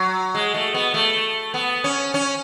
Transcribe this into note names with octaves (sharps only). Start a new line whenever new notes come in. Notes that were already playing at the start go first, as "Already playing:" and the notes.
Already playing: F#3
G#3
A3
B3
A3
B3
C#4
C#4